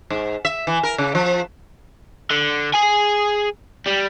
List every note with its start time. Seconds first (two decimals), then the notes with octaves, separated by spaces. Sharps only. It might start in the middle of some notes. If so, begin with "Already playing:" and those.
0.10 G#2
0.45 E5
0.67 E3
0.83 A#4
0.98 C#3
1.15 F3
2.31 D3
2.74 G#4 G#5
3.86 G3